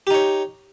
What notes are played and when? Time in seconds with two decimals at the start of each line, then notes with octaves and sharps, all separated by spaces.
0.07 G4
0.10 D#4
0.14 C#5